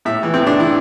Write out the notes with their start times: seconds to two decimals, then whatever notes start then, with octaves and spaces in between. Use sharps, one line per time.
0.05 A2 E5
0.23 E3
0.34 C4
0.40 A2
0.47 D4
0.56 E3 E4